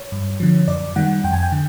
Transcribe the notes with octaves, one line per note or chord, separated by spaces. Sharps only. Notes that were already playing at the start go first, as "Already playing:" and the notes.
Already playing: C#5
G2
D3 F3
F#2 D5
D#3 G3 F#5
F2 G5
G#5
G5
D3